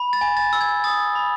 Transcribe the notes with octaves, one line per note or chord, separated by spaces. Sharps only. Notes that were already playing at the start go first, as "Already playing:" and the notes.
Already playing: B5
A6
G#5
A6
E6
G#6
D#6 A6
B5